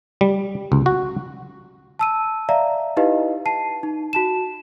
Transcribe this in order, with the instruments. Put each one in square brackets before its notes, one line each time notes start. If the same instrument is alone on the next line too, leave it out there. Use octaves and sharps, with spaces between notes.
[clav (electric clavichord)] G3
C#2
F#4
[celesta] A5 E6 D#7
D5 E5 F5 A#5
D#4 E4 G4 B4 D#5 F5
A5 C7 D#7
D#4
F#4 A5 E7